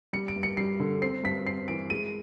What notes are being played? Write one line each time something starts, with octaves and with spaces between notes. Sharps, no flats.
G3 C#7
D7
G2
C#7
G3 C7
D3
C4 C7
G2 B6
C4 C7
E3 D7
G#3 D#7